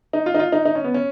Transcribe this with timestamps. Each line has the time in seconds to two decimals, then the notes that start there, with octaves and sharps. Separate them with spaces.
0.13 D#4
0.26 F4
0.35 D#4
0.39 F4
0.52 D#4
0.65 D#4
0.75 C#4
0.84 B3
0.94 C#4